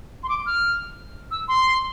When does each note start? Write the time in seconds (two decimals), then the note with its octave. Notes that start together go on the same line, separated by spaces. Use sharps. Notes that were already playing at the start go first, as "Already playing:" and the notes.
0.23 C6
0.29 D6
0.46 F6
1.31 E6
1.48 C6